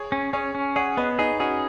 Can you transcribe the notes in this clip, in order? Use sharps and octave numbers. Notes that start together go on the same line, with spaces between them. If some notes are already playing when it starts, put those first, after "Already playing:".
Already playing: G#4 C#5
C#4
C#4 G#4 C#5
C#4
G#4 C#5 F#5
B3 B4 D#5
D#4 G#4
C#4 F#4 G#4